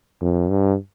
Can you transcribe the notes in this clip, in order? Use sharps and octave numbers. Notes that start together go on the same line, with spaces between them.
F2
G2